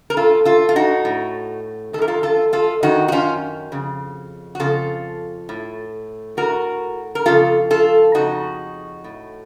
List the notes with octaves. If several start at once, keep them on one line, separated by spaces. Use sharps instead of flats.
A#4
A2 F4 A4
F4 A4
F4
D#4 F#4
A2
D#3 A4
F#2 A#4
F4 A4
F4 A4
F4 A4
F#2 D#3 D#4 F#4
F#4
C#4 F4
F2 C#3
F#4
F2 C#3 F4 A4
A2
A2 F#4 A#4
A#4
F2 C#3 F4 A4
F4 A4
F2 C#3 D#4 F#4
A2